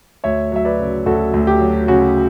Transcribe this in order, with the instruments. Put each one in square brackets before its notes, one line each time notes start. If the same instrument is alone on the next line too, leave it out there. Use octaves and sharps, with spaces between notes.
[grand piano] D2 C#5 E5
F#3 E5
B4 D5
C#3
D2 F#4 A4
D2
G4
F#3
C#3 F#4